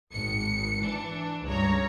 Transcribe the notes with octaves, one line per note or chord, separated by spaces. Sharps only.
G#1 C#7
E3 D4
C#2 G2 G3 C#5 A#5